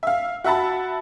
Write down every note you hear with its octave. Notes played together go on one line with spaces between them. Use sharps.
E5 F5
F#4 E5 F#5 A5 B5